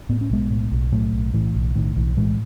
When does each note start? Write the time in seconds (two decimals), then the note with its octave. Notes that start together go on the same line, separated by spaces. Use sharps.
0.09 A2 B3
0.21 C#4
0.30 B1 G#3 B3
0.51 A2
0.71 B1
0.92 A2 F#3 A3
1.13 B1
1.34 A2 E3
1.55 B1
1.75 A2 D#3
1.96 B1 E3
2.17 A2 E3 G#3